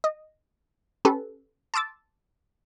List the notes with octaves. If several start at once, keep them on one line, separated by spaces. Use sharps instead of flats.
D#5
C#4 G4 A4 B4
A5 C6 D6 E6 A6